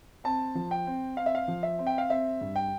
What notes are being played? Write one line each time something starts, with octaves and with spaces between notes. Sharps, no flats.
C4 A5
F3
G5
C4
C4 F5
E5
F5
F3
E5
C4
G5
F5
C4 E5
G2
G5